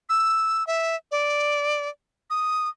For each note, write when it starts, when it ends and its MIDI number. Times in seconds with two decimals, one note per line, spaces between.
0.09 0.66 88
0.67 0.96 76
1.11 1.88 74
2.30 2.69 87